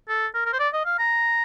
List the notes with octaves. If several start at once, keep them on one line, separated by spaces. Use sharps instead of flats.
A4
A#4
A#4
C5
D5
D#5
F5
A#5